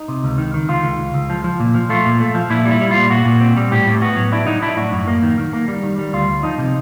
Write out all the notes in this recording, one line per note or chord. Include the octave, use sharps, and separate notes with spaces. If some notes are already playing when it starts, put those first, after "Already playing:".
Already playing: D#4
C3
C#2
D#3
D#3
C#2 F4
C#2
C#2
C#2
F3
F3
A#2
F3
A3 F4
A#2
A3
F3
A#2 E4
G3
E4
G3
A#2 F4
A#2 F#4
A#2
C4
G3
A2 G4
A2
B3 F#4
F#3
D4 E4
F#3 D#4
D4 E4
A2 F#4
F#2
A#3
D#3
D#3
A#3
G3
D#3
G3
D2 F4
D2
F3 D#4
C3